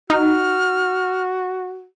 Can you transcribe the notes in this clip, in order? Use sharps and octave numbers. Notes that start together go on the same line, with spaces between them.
D#4 F#4 F6